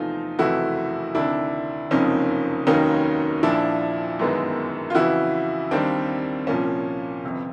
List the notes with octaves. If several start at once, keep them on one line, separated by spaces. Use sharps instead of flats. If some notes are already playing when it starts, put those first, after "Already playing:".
Already playing: E2 C3 F3 A3 D#4 F4
F#1 F2 C3 E3 A3 E4 F#4
D2 C3 D#3 D4 E4
F#1 F2 C3 F3 A#3 C#4 D#4
F1 D#2 D#3 F#3 A#3 C#4 D#4
A#1 A#2 F3 D4 E4
G1 F#2 D#3 G#3 B3
F4
F2 C#3 E3 E4 F#4
D#2 D#3 G3 A#3 C4 D4
C2 A#2 F3 A#3 C#4
G1 F2 C3